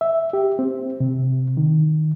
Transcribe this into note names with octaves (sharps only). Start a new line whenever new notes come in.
E5
G4
C4
C3
D#3